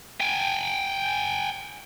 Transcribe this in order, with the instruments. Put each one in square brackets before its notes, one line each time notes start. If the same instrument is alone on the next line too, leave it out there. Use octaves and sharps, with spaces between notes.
[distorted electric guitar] G5 G#5